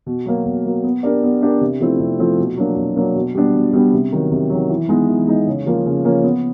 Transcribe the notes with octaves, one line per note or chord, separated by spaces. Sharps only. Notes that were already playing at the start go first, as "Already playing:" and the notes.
B2
F#3 A#3
B2
F#3 A#3
B3
D4 G4 A#4 D5
B3
D4 G4 A#4 D5
C3
F3 A3 C4 E4
C3
F3 A3 C4 E4
B2
F#3 A#3 D4
B2
F#3 A#3 D4
B2
G3 B3 D4
B2
G3 B3 D4
C3
D#3 F#3
C3
D#3 F#3
E3
G#3 B3 D#4
E3
G#3 B3 D#4
C#3
F3 A#3 C#4
C#3
F3 A#3 C#4
B3